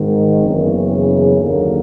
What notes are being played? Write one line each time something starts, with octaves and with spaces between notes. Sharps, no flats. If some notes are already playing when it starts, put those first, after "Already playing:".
Already playing: G#1 G#2 D#3
F#1 E2 C#3
D#2 D3 F#3 A#3